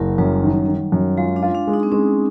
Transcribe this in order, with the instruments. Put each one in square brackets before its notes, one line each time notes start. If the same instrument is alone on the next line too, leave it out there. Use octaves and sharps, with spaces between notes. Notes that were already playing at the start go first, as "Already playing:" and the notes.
Already playing: [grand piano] F#1 [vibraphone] F#3
[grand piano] F#2 [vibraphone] G3
[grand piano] D#3
D#3
F#2
[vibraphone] G#3 [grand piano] F4
[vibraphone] D4
[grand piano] F4
[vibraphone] D4
[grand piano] G#3
[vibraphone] D#4
C4
[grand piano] G#3 [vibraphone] C#4